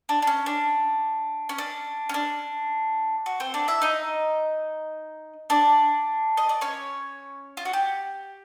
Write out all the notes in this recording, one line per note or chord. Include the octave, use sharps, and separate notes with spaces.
D4
D4
C#4
D4
C#4
D4
C#4
D4
F#4
C4 C5
D4 D5
E4 E5
D#4 D#5
D4 D5
D#5
D5
C#4 C#5
F4
F#4
G4